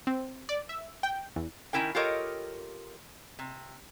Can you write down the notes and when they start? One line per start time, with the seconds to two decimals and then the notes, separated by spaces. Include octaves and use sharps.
0.07 C4
0.49 D5
0.69 E5
1.03 G5
1.36 E2
1.73 D#3 C#4 E4 A#4 G5
1.95 F4 G4 A4 A#4 C#5 D#5
3.39 C3